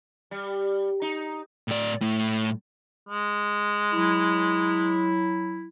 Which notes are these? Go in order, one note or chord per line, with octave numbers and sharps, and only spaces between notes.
G3
D#4
A2 D5
A2
G#3
F#3 E4